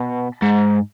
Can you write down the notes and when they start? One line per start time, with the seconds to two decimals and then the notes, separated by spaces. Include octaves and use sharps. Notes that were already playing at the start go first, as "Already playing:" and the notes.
Already playing: B2
0.43 G#2